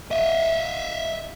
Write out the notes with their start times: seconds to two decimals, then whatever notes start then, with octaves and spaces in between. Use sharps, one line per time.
0.11 D#5 E5